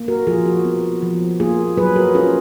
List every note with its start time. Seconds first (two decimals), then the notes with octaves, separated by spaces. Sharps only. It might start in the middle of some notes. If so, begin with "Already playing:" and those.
Already playing: A#3
0.08 F#4 A#4
0.27 F3 F4 G#4
0.46 F#4
0.65 B3
1.02 F3
1.40 A#3 F4 G#4
1.77 F#3 G#4 B4
1.96 F#4 A#4
2.15 C#4 F4 G#4